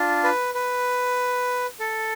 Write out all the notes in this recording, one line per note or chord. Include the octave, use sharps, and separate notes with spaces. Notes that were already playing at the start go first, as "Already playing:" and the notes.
Already playing: D4 F4
B4
B4
A4